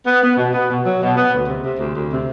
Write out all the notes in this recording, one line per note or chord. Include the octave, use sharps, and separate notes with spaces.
B3
B3
B2
B3
B2
F#3
B2
B3
D2
C3
C3
D2
D2
C3